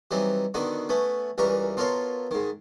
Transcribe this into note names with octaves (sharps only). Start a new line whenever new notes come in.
E3 F#3 G3 C4 D#4
B2 D3 D#3 D#4 F#4
A3 B3 C#4
C#2 E3 G3 A#4 C#6
B2 F4 A4 A#4 C#5 C6
G#2 D#3